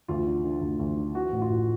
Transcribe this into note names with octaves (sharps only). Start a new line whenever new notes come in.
D2 F4
D3
D3
D2
D2
D3
E3 F#4
A1
F4
A2